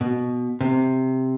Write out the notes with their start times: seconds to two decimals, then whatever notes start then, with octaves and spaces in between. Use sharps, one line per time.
0.01 B2
0.61 C3